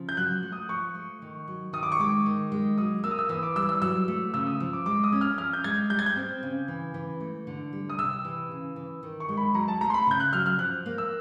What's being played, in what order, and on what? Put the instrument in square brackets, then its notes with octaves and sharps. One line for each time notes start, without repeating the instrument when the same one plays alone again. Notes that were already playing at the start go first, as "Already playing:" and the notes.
Already playing: [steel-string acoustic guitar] C#3 F3
[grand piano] G6
[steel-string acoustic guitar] F#3 [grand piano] F#6
[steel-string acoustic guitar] A3
[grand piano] D#6
[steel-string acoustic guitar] F3 [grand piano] C#6
[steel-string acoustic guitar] A3
D#3
F#3
[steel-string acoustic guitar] D#3 [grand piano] D#6
[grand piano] D6
C#6
[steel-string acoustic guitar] G#3 [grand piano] D6
[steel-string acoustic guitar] D#3
G#3
[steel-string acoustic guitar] F#3 [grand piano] D#6
[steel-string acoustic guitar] A#3 [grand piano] E6
[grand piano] D#6
E6
[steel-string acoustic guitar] E3 [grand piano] D#6
[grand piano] D6
[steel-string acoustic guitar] G3 [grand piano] E6
[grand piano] E6
[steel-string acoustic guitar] F#3 [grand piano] E6
[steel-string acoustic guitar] A3
[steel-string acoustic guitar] C#3 [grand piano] E6
[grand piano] D#6
[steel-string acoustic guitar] F3
[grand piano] D6
[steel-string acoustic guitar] G#3 [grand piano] D6
[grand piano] D#6
[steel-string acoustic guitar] C#4
[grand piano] F6
[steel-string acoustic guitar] F3 [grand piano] F6
[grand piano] G6
[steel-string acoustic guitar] G#3 [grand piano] G#6
[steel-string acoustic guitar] G3 [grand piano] G6
[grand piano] G#6
G6
[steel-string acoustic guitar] C4
C#3
E3
E3
A3
D3
G3
[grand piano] D#6
[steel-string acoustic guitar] C3 [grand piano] E6
[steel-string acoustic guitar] E3
C#3
E3
D#3
[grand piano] C#6
[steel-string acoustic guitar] G#3
[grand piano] B5
[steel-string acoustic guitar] F#3 [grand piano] A#5
[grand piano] A5
[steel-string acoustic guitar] A3 [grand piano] A#5
[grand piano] C6
B5
[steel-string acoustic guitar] C#3 [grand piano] G6
[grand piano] F#6
[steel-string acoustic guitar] F#3 [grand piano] F6
[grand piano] F6
[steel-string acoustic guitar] F3 [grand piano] F#6
[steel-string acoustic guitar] A#3
[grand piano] E6